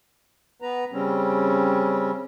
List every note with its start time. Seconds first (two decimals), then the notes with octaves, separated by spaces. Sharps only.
0.62 B3 B4 A#5
0.92 C#3 G3 C4 C#4